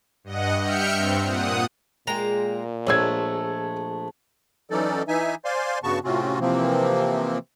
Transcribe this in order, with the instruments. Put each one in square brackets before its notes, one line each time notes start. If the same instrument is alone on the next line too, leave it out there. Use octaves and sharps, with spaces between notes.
[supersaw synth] G2 D#5 F#5
E5 G5 F6 G6 C#7
G2 C4
A#2 F#5 D#6
[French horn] A#2 [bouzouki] G#3 A#3 G5 [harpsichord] A#5
[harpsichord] A#1 [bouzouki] F3 G#3 A3 [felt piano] C#5 E6 G#6
[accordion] E3 F#3 C#4 D#4 A4 D5
E3 D#4 E5 G#5
C5 D5 F5 G#5 C6
G2 C#3 B3 F#4 A5 C#6
A2 C3 C4 C#4 F4 F#4
C3 E3 F3 A#3 C4